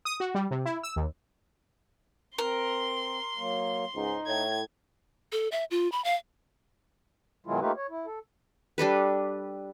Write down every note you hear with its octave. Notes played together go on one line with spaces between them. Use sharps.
D#6
F#4
G3
C3
E4
E6
D#2
C4 A#4 C6
F#3 A#3
C#2 G#2 D#4
A2 G#6
A4
E5
F4
B5
F5
B2 D#3 F#3 G#3 E4 F4
A3 A#3 D#4 F4 G4 B4
C#5
E4
A4
G3 D4 A4 B4